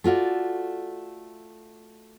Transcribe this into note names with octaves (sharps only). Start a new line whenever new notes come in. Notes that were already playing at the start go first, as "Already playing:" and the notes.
A3 F4 F#4 D5